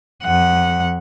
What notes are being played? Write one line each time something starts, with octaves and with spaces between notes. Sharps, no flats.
F2 F#5